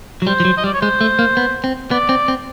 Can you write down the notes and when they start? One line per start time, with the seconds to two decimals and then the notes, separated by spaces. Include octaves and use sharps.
0.22 F#3
0.27 G3 C5
0.40 F3
0.45 F#3
0.57 D#5
0.64 G3 D5
0.74 C#5
0.81 G#3 C5
1.01 A3
1.19 A#3
1.37 B3
1.64 C4
1.91 B3 D5
2.09 C4
2.28 C4